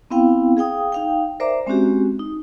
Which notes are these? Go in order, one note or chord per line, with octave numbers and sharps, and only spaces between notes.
B3 C4 E4 F5 G5
G#4 F5 G5 D#6
D#4 F5 G5
A#4 C5 D5 E5 A#5 D6
G#3 C4 C#4 F#4 G4
D#4